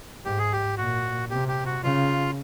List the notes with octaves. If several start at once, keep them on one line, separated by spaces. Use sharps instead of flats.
G#2 G4
G#4
G4
A#2 F#4
C3 G4
G4
F#4
C#3 F4